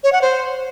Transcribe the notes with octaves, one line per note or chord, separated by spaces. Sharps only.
C#5
F#5
C5